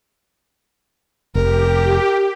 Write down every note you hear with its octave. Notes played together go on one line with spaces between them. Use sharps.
F1 G4 A#4